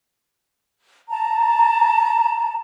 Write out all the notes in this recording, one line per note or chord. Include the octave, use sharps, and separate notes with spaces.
A5 A#5